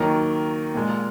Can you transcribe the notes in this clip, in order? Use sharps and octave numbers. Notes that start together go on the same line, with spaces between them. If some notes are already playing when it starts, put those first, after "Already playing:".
Already playing: D#2 D#3 F#3 A#4
A#2 G#3